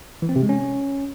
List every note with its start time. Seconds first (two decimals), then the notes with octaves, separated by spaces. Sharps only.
0.22 E3
0.29 C4
0.36 C3
0.42 G#3
0.49 C#4